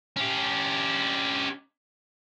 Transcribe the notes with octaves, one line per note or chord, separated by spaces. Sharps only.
C#4 G4